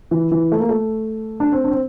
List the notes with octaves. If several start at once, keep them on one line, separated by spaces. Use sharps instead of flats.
E3
E3
A3
A#3
A3
D4
C4
D4
C4